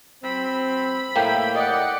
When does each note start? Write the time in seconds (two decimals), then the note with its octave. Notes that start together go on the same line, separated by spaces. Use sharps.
0.24 F#3 C4 B5
1.16 A2 A#3 E5 G5
1.55 D5 D#5 F#5